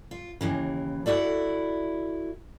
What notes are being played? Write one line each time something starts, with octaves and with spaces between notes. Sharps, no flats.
F4
D#2 C#3 E3
E4 F#4 A4 D5